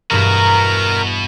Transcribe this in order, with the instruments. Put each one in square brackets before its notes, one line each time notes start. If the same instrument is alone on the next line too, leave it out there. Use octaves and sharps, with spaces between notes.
[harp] E1 G2 G#4 [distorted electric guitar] B2 F#4 [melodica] A#4 A#5